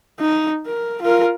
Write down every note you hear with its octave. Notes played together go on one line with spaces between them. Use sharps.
D#4
A#4
F4 A#4